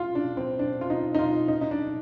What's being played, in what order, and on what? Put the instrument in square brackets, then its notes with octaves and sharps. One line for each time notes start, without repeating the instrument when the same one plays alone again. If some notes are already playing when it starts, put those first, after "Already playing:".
Already playing: [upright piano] F4
D4
C4
D4
F4
D#4
D#4
F4
D#4
D#4
D4